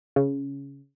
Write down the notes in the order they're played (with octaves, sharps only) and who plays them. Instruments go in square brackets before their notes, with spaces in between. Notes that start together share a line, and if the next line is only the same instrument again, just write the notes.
[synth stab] C#3